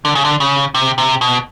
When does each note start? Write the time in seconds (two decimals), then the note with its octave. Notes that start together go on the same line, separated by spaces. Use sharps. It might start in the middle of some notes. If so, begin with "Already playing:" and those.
0.05 D3
0.15 C#3
0.25 D3
0.40 C#3
0.75 C3
0.98 C3
1.21 B2